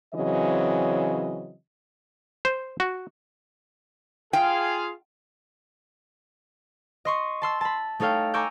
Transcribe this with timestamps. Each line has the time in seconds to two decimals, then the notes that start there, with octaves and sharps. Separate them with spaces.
0.14 C#3 E3 F#3 C4 D#5
2.45 C5
2.80 F#4
4.33 F4 G#4 F5 G5
7.05 D#5 C6 C#6
7.42 A5 C6 E6
7.61 A5 B5
8.00 A3 D#4 A4 C#5 F5 G5
8.34 G#5 A#5 C#6 D6 E6 G6